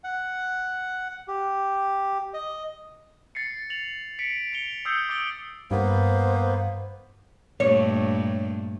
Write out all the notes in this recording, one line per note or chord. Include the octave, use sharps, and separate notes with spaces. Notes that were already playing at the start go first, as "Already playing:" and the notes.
F#5
G4
D#5
A6 C7 C#7
A6 F7 F#7
B6 C#7 D7
C#7 F7 G7
D#6 E6 G6 C7 C#7
D6 D#6 A6 D7 G7
G2 A#3 B3 C5
G2 A#2 A3 C#5